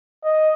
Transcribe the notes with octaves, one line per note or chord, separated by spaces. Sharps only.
D#5